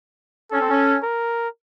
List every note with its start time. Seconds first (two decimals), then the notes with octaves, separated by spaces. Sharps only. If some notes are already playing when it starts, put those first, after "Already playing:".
0.51 C#4 A4
0.60 C4
0.69 C#4
1.03 A#4